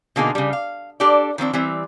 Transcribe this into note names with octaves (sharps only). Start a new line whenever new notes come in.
B2 D3 A#3 D#4 G#4
C#3 G3
F5
D4 G4 A4 D5
D#3 F3 C4 D4
E3 G3 C4